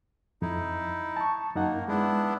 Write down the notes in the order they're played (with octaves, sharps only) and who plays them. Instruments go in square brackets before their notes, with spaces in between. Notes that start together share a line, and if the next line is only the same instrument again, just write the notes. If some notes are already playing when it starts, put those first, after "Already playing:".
[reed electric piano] F2 [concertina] D#4 E4
[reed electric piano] A5 C#6
[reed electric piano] F#2 D#4 F#5 [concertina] A#3
[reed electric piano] G#3 [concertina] B3 D4 E4